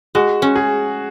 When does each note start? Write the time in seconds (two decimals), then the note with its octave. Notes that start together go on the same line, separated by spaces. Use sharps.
0.15 G#3 F#4
0.42 C#4
0.56 G#4